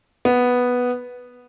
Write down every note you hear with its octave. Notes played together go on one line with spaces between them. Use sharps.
B3